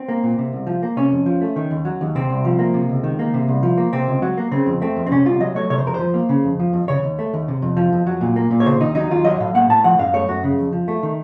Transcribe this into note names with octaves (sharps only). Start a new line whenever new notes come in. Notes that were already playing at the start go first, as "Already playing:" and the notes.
Already playing: C4
A#3
A#2
C3
C2
F3
A#3
C3 C#4
F2
F3
A3
D#3
D#2
F#3
D#2
C3 C4
C2
F3
A#3
C3
C#2
D#3
A#3
C3
C2
F3
A#3
C3 C4
C#2
F#3
A#3
C#3 C4
F2
A3 C4
F2
C4
C3 C#4
C2 F4
F#3 D#5
A3 C#5
C3 C#5
C5
F2 A#4
F3 C5
A#3
C#3
F2
F3
F2
C#3 C#5
D#2
A3
D#2
C3
F2
F3
F2
F#3
A#2
A#3
A#2
C#5
C#3 C5
D#2 D#4
F#3 D#4
D#2 F4
F#3 D#5
A2 F5
A#3 F#5
A2 A5
F3 F#5
F#2 F5
A3 C#5
F#2 F#4
C#3
F2
F3
A3
D#3